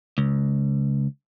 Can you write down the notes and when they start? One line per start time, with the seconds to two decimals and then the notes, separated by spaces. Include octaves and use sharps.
0.18 C#2